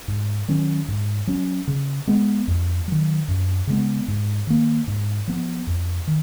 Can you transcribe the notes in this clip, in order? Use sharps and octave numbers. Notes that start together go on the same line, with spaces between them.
G#2
D#3 F#3 C#4
G#2
F#3 C#4
C#3
G#3 B3
F2
D#3 F#3
F#2
C#3 G#3 B3
G#2
D#3 A#3
G#2
F3 B3
F2
D#3